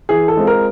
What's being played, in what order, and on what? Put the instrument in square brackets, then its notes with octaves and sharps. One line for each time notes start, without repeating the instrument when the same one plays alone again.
[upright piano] E3 G#4
A4
G#3 C4 F4
A#4